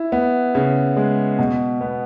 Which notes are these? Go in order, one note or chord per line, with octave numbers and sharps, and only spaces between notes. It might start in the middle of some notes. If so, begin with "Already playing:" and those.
Already playing: E4
B3
C#3
G#3
B2
B3